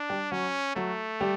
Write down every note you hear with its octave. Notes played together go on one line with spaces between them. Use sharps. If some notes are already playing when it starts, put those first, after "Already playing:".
Already playing: D4
G3 G4
F#3 C#4 F#4
F#3 A3 F#4
G3 G4